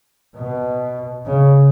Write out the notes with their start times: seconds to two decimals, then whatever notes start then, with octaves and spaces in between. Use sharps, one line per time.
0.36 B2
1.26 C#3